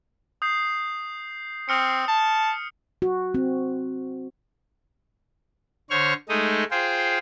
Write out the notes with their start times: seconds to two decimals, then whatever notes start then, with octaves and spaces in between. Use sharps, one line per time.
0.42 D#6 G6 C7
1.69 C4 D#6 F6 C#7
2.08 A5
3.02 F#4
3.34 C4
5.90 D3 C5 C#5 C#6 F6
6.29 G#3 A3 D#4 D#5
6.71 F4 G#4 C5 G5